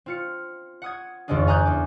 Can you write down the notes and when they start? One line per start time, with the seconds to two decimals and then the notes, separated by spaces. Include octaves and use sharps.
0.06 C4 F4 C#7
0.82 F#5 D#6 G#6
1.28 G#1 F2 C#3 G#3 D4 G#4
1.47 G#5 A#5 D#6 F#6 G6
1.65 E2 D6